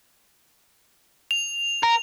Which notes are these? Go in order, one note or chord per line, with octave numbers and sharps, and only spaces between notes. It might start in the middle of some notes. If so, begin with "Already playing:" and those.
F7
A#4